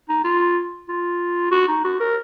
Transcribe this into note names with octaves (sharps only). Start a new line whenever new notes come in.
D#4
F4
F4
F#4
D#4
F#4
A#4